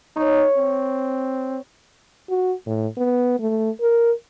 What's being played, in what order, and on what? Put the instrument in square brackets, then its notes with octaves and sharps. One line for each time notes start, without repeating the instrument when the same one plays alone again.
[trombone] D#4 [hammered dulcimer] C#5
[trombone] C4
[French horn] F#4
A2
B3
A3
A#4